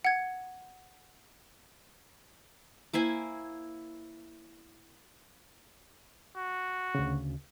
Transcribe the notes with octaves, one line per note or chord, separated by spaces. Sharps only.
F#5 G#6
A#3 E4 C5 G#5
F#4
D2 C#3